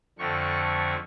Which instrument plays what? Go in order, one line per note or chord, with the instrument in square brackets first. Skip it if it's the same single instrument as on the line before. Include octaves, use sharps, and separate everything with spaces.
[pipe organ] F2 D3 A3 C#6